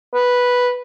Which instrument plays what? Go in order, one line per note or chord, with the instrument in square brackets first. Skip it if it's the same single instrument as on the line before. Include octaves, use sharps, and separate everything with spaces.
[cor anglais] B4